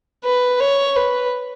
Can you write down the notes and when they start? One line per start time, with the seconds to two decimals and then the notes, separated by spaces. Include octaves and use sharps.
0.25 B4
0.60 C#5
0.96 B4